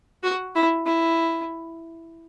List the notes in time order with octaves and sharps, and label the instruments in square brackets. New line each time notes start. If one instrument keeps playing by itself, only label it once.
[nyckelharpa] F#4
E4
E4